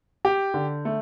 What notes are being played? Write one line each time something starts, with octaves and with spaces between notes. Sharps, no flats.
G4
D3
A3